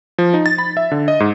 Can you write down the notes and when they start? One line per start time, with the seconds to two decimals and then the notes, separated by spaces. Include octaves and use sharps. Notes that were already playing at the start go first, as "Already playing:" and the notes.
0.18 F3
0.34 D#4
0.46 A6
0.58 B5
0.77 E5
0.91 D3
1.08 D#5
1.20 G#2